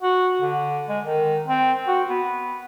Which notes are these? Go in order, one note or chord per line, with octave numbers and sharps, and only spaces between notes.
F#4
D3
G#3
D#3
C4
F#4
B3